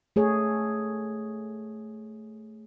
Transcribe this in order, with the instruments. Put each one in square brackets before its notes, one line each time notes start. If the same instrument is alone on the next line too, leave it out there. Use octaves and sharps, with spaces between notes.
[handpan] A3 G#4 C#5